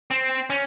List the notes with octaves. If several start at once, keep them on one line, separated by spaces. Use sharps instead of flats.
C4
C#4